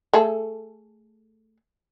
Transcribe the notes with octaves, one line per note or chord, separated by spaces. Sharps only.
A3 G#4 A4